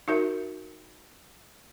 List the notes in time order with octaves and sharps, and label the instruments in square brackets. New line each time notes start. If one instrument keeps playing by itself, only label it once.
[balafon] D#4 F#4 A#4 E5